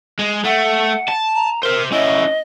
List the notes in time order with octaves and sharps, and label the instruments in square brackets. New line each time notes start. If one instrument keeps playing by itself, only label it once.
[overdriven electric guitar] G#3
[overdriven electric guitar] A3 [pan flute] F#5
[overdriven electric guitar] A5
[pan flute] A#5
[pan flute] A#4 [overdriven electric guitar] C5 E5
[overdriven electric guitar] C#4 E4 [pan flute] D#5